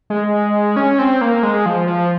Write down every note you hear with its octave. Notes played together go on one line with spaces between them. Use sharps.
G#3
C#4
C4
A#3
G#3
F3
F3